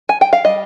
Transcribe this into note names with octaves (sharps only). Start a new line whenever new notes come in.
G#5
G5
F5
G3 D#5